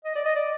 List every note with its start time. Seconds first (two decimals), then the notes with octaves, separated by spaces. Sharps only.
0.05 D#5
0.15 D5
0.26 D#5
0.36 D5